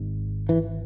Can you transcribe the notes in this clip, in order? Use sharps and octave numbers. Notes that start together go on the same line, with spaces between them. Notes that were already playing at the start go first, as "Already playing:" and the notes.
Already playing: G#1 G#2
E3